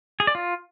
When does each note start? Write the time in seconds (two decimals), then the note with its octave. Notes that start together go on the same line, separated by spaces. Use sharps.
0.20 G#4
0.27 D5
0.35 F4